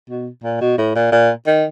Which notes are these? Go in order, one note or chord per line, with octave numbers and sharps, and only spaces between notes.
B2
A#2
B2
A2
A#2
A#2
D#3